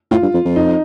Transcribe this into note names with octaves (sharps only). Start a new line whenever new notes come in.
A2 F4
G2
F2
F2
D#4